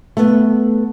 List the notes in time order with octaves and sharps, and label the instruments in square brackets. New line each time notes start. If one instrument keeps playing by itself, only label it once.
[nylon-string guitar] A3 B3